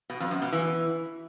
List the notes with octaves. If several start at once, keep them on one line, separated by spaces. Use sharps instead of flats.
B2
F2
F#2
B2
E3